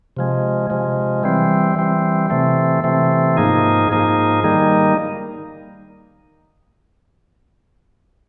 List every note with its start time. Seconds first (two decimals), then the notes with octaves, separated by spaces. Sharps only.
0.17 C3 F3 G#3
0.70 C3 F3 G#3
1.23 E3 G3 C4
1.76 E3 G3 C4
2.30 C3 E3 A3 C4
2.84 C3 E3 A3 C4
3.37 G#2 F3 A#3 D#4 G#4
3.90 G#2 F3 A#3 D#4 G#4
4.44 D#3 G3 A#3 D#4